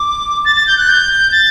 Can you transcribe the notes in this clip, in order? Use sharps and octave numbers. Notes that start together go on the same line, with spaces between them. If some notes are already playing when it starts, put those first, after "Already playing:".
Already playing: D6
A6
A6
G6
F#6
G6
A6